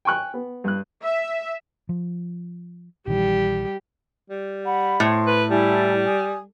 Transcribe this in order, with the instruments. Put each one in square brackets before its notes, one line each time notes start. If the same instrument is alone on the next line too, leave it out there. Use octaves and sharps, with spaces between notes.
[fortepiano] G5 G#5 C#6 F#6
B3
G2 F#6
[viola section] E5
[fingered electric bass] F3
[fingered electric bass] A#1 D#3 E3 [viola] G3 G4
[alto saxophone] G3
[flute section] F#5 B5
[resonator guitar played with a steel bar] A2 [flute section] C5
[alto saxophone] B4
[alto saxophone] G3 [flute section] E4 G#5 A5
[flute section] G#5 D#6